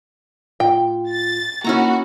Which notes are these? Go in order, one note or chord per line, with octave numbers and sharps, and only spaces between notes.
A2 F4 G5
A6
A#3 C#4 D#4 E4 F#4 A#5